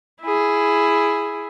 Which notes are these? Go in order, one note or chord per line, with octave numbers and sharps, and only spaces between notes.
E4 G#4